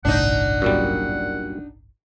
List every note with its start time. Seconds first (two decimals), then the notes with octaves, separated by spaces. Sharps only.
0.05 G1 C2 A2 D4 D#4 F#5
0.62 F#2 A#2 G3